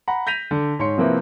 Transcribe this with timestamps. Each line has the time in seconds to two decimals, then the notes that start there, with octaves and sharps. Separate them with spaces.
0.08 F#5 A#5 B5
0.27 G6 A#6 B6 D#7 F7
0.51 D3
0.79 G#2 C#5 C6 C#7
0.98 C3 F3 A#3 C4 E4 B4